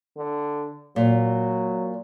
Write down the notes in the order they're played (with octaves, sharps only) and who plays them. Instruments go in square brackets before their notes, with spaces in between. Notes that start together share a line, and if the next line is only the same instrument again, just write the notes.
[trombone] D3
[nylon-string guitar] A#2 [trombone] F#3